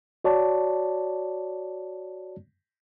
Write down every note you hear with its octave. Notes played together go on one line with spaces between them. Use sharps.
F#4 C#5 D5 A5